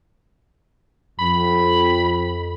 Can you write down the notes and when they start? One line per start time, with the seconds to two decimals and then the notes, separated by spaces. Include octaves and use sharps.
1.19 F2 B5